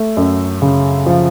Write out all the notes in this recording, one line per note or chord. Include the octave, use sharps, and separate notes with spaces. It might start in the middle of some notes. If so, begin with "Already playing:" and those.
Already playing: A3
F#2
C#3
F3